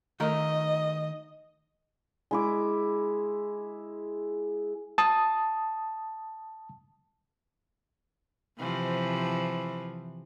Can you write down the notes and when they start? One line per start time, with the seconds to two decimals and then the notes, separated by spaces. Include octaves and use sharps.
0.20 D#3 A3 A#4 D#5
2.31 G#3 E4 D6
4.98 A5 D#6
8.59 C3 E3 F3